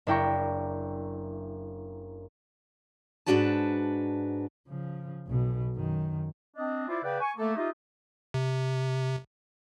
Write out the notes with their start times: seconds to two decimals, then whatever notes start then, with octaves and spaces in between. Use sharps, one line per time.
0.07 F#1 D4 E4 G5 A#5 C#6
3.26 G#2 C#3 D4 F#4 B4 A5
4.68 C#3 F3
5.27 B1 B2
5.76 F#2 D#3
6.57 C4 D4 D#5
6.89 E4 F4 C5 D5 E5
7.03 C#3 B4 D5 F#5 G5
7.21 G#5 C#6
7.37 A3 A#3 A4
7.56 D#4 F4 G4 D#5 E5
8.34 C3